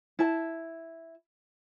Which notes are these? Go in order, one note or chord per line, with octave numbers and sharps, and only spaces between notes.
E4 A5